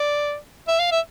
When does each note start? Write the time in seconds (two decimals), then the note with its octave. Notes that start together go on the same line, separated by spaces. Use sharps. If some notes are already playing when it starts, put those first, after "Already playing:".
Already playing: D5
0.68 E5
0.79 F5
0.91 E5